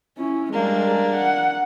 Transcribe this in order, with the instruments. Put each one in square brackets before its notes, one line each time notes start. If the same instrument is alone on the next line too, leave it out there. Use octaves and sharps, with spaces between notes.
[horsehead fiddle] C#4 E4
[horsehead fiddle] G3 G#3 [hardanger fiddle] A#3 D4
[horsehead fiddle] F#5